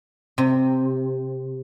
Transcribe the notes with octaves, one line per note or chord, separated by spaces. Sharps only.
C3